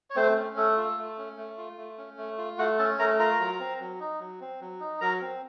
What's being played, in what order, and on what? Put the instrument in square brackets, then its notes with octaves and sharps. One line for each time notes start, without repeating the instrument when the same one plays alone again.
[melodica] C#5
A3 C4 C5
C#4
A3 A4
F4
A3
C#4
A3
F4
A3
C#4
A3
F4
A3 F#4 F#5
C#4 A4 A5
A3 A#4 A#5
F4 A#4 A#5
F#3
C4
F#3
D#4
F#3
C4
F#3
D#4
F#3 A#4 A#5
C4